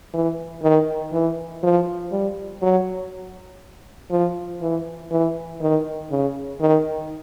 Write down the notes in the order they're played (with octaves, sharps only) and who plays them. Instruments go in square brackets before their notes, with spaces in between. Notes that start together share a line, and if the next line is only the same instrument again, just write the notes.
[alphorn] E3
D#3
E3
F3
G3
F#3
F3
E3
E3
D#3
C#3
D#3